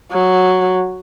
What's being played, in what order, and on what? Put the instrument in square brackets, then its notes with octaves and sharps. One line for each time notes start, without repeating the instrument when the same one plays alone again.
[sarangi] F#3